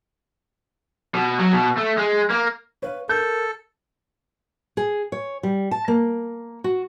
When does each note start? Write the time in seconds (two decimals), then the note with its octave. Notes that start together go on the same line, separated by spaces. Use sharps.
1.15 B2
1.40 F#3
1.53 B2
1.77 A3
1.98 G#3
2.30 A#3
2.82 B4 C#5 F5
3.09 A4 A#4 G6
4.77 G#4
5.12 C#5
5.43 G3
5.71 A5
5.88 A#3
6.64 F#4